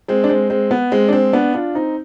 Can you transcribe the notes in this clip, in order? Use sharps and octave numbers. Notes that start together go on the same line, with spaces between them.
G#3 C4
D4
G#3 C4
G#3 C4
B3
G#3 C4
D4
G#3 C4
B3 D4
D4 F4
C4 D#4